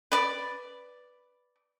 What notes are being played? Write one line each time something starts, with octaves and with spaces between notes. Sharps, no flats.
B4 D5